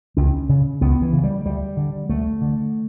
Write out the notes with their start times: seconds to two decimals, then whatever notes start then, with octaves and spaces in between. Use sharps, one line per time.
0.17 C#2 C#4
0.49 C#3
0.81 C#2 B3
1.02 E3
1.13 C#3
1.24 G3
1.45 D2 G3
1.77 D3
2.09 D2 A3
2.41 D3